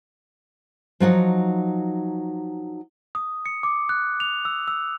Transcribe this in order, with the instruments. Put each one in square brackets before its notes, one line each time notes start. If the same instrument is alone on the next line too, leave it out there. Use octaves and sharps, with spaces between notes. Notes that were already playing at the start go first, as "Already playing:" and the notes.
[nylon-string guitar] F3 F#3 D#4 F#5
[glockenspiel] D#6
C#7
D6
F#6
F7
E6
E6